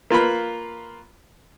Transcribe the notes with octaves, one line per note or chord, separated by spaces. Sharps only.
A#3 F4 B4 B5